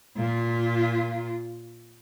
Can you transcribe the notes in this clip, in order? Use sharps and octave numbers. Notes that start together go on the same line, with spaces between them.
A#2 F4